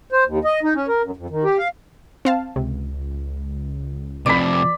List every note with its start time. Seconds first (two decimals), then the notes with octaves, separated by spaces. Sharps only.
0.12 C5
0.26 D#2
0.45 D#5
0.63 D#4
0.75 C#4
0.88 A#4
1.02 F#2
1.16 F2
1.30 D#3
1.44 G4
1.58 F5
2.25 C4 F5 A5
2.56 C#2 C3
4.26 F2 C3 D5 B5 D7